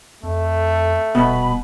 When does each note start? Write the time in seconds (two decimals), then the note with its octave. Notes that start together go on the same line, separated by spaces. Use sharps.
0.23 F2 A3
1.15 D#1 B2 B5